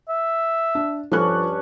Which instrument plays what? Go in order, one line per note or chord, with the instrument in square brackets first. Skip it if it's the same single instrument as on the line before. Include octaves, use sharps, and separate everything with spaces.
[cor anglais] E5
[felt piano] D4
[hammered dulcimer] G2 C#4 C#6 [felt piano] F3 A4 F#6